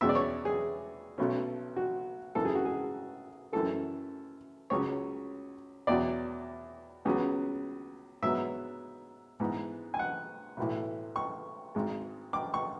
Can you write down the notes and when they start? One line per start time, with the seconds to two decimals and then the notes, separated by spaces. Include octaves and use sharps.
0.01 E2 B2 G#3 C#4 E5
0.09 D5
0.15 C#5
0.45 G#4
1.18 B1 B2 A3 C#4
1.76 F#4
2.35 G#1 F#2 E3 A4
2.45 G#4
2.55 F#4
2.65 G#4
3.53 F#2 E3 A3 A4
4.70 C#2 C#3 F#3 C#4 C#5
5.87 E2 B2 F#3 D5
7.05 C#2 C#3 F#3 B3
8.22 G#2 F#3 B3 E5
9.40 G#2 E3 B3
9.94 G#5
9.99 F#5
10.57 B1 A2 E3
11.16 C#6
11.75 G#1 G#2 G#3
12.33 D6
12.54 C#6